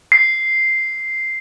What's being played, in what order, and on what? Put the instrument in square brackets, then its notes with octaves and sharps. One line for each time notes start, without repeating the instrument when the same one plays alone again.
[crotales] C7